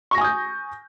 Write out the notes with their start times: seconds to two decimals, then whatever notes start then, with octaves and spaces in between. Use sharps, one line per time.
0.11 C#6
0.15 A#6
0.18 G#5
0.21 D#6
0.24 G6